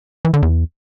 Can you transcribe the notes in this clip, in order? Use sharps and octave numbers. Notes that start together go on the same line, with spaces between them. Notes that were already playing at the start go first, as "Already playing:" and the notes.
E3
D3
E2